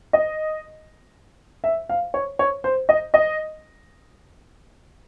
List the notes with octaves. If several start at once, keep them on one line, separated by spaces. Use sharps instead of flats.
D#5
E5
F5
C#5
C#5
C5
D#5
D#5